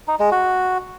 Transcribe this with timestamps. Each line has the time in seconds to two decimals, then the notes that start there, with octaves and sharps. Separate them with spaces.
0.08 D#4
0.20 G#3
0.32 F#4